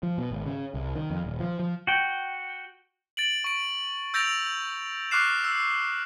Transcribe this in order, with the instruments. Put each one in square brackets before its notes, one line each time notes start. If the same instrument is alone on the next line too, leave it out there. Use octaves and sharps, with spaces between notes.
[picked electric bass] F3
B2
G#1
C#3
C2
D#3
F2
D#1
F3
F3
[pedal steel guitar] F#4 G5
[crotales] A6 D7 F#7
C#6 D7
E6 G6 A6 A#6 D7 F7
C#6 D6 F6 F#6 C7 E7
E6